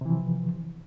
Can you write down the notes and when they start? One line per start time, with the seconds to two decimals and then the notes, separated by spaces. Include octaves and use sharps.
0.01 C3
0.06 E3
0.10 F3